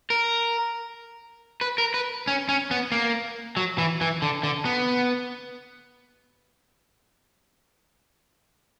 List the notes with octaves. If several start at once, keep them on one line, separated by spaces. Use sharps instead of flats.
A#4
B4
A#4
B4
C#4
C#4
B3
A#3
F#3
E3
E3
D3
D3
B3